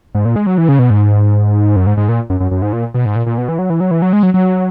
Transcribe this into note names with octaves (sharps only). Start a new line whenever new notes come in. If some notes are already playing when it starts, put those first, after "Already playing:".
G#2
A#2
G#3
F#3
E3
C#3
B2
G#2
F#2
G#2
G#2
A#2
F#2
F#2
F#2
G#2
A#2
B2
G#2
A#2
A#2
B2
E3
F#3
E3
F#3
E3
F#3
G#3
F#3
F#3